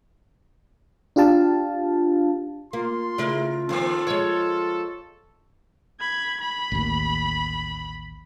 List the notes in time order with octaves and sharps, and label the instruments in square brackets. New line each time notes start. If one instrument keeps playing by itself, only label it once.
[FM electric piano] D4 F4 G4 F5 A5
[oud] A#3 [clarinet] F4 [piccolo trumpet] C6
[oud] C#3 A3 E4 [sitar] A#4
[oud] D#3 F3 [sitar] A#3 C4 [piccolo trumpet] A4
[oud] F3 G#3 [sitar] C#5
[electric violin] B5 G#6
B5
[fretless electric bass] A1 D#2